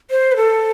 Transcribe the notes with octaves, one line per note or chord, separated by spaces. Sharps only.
C5
B4
A4